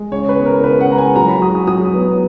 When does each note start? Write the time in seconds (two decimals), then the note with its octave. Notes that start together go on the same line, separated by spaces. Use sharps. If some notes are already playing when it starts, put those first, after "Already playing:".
Already playing: G#3
0.11 C#3 C#5
0.29 B4
0.37 B3
0.46 A#4
0.63 C#3 B4
0.81 F#5
0.89 G#3 A#5
0.98 G#5
1.16 F#3 A#5
1.28 B5
1.41 F#4 D#6
1.55 D#6
1.67 F#3 D#6
1.94 B3